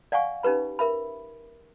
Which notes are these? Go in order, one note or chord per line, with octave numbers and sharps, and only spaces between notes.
D5 F5 F#5 G#5 C#6
C#4 D#4 G4 B4 B5
A#4 E5 B5